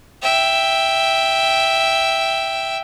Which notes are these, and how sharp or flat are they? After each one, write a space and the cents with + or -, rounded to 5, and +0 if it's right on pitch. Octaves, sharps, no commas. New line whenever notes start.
E5 +0 G5 +0